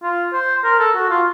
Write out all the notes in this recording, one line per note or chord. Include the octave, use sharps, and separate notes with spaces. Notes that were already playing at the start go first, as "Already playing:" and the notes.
F4
C5
A#4
A4
F#4
F4